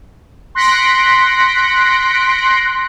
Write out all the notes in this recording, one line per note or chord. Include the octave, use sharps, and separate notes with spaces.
C6 F#6 A#6 B6 C#7 D7